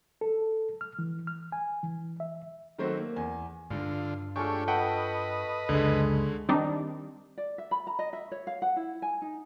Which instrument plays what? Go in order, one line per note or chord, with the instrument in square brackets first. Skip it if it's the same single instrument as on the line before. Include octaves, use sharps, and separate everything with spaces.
[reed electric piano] A4
F6
E3
F6
G#5
E3
E5
[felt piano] D#3 F#3 A3 C4 F#4 C5
A#3
E2 G#5
[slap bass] G2 [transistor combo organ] D3 F4
[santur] G#3 A3 F4 [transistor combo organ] D4 G4 C#5 [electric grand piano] C#6
[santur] A3 [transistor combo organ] B4 D#5 [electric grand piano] F#5 G5
[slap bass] C#2 F#2 [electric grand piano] D3 G#3
[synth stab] D#3 G3 C4 D4 D#4
[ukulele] D5
E5
B5
A#5
D#5
E5
C#5
F5
F#5
E4
G#5
D#4